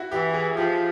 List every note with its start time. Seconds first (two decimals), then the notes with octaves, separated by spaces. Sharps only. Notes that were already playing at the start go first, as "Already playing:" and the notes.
Already playing: E4 F#4
0.12 E3 G4
0.34 G#4
0.57 F3 G4